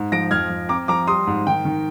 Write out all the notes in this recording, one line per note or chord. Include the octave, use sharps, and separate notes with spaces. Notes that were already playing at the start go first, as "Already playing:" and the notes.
Already playing: G#2
F3 A#6 D7
F2 F6 G#6
F2
C4 A#5 D6
F3 A#5 D6
G3 C6 D#6
G#2
D#3 G5
D#3